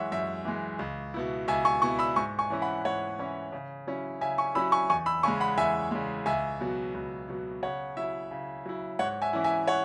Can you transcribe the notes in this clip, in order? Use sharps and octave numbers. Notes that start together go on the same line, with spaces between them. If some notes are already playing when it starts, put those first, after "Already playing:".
Already playing: F#2 E3 G#3 C#5 E5 F#5
F#2 E5
E3 G#3
C#2
B2 B3 E4
C#2 E5 G#5
G#5 C#6
B2 B3 E4 G#5 C#6
B5 E6
G#2 G#5 C#6
G#5 C#6
E3 C#4 E4
F#5 B5
G#2 C#5 F#5
E3 C#4 E4
C#3
F#3 C#4 E4
C#3 E5 G#5
G#5 C#6
F#3 C#4 E4 B5 E6
G#5 C#6
E2 G#5 C#6
B5 E6
C#3 G#3 G#5 C#6
F#5 B5
E2 E5 G#5
C#3 G#3
C#2 E5 G#5
B2 F#3 B3
C#2
B2 F#3 B3
C#3 C#5 F#5
F#3 E4 E5
C#3
F#3 E4
G#2 C#5 F#5
E5 G#5
E3 C#4 E4
E5 G#5
C#5 F#5